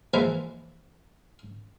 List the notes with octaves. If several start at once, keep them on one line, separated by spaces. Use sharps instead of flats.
E3 F3 G#3 A#3 E4 B4